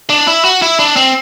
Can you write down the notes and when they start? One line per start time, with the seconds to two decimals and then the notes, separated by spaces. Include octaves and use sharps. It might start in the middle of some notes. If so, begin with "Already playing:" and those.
0.10 D4
0.27 E4
0.45 F#4
0.62 E4
0.79 D4
0.96 C4